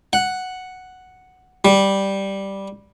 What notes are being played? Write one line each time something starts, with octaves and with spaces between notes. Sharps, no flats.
F#5
G3